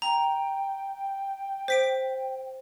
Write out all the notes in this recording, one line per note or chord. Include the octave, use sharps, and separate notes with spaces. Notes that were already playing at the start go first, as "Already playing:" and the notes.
G5 A#5
C5 B6 D7